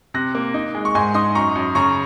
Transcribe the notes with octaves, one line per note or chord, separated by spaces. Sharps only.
C3 F#6 A#6
A#3
D#4
G#3
C#6
G#2 G#5 C6
D#4 C6 D#6
F#2 A#5 C#6
F#2
C#3 A#5 C#6